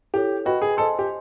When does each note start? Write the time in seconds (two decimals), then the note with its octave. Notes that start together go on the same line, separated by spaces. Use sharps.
0.14 E4 G4 A4 C#5
0.45 F#4 B4 D#5 G5 B5
0.62 G#4
0.77 A4 C5 D#5 G#5 C6
0.99 G4